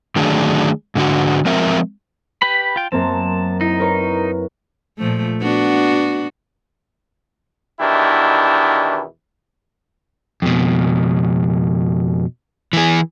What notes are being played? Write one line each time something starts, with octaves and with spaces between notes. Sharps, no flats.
D3 D#3 F#3 A3 D4 G#4
G#2 D3 F#4
F3 G#3 C4 A#4 E5
G4 B4 B5
F4 G5
F#2 A#3 C4 A5
D#4 E4
A#4 B4 C#5
A#2 F3 A3
B3 D4 F#4
E2 B2 D#3 D4 E4 G4
F2 B2
E3 G#4